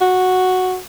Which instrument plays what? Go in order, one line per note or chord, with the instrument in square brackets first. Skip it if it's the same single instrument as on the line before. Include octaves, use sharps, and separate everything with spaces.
[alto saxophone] F#4